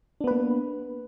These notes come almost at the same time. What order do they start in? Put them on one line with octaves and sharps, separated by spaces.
D4 B3 B4 A#3